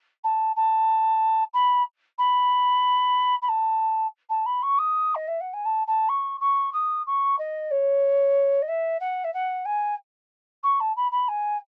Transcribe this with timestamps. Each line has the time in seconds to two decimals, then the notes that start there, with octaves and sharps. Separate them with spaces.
0.24 A5
0.56 A5
1.54 B5
2.18 B5
3.42 B5
3.48 A5
4.29 A5
4.46 B5
4.63 C#6
4.78 D#6
5.15 D#5
5.28 E5
5.40 F#5
5.53 G#5
5.65 A5
5.87 A5
6.09 C#6
6.40 C#6
6.73 D#6
7.06 C#6
7.39 D#5
7.71 C#5
8.62 D#5
8.68 E5
9.00 F#5
9.24 E5
9.34 F#5
9.65 G#5
10.63 C#6
10.80 A5
10.96 B5
11.12 B5
11.28 G#5